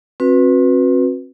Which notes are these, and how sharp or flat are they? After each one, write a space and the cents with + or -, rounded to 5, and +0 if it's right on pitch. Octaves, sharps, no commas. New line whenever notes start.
C4 +35 F#4 -30 B4 +0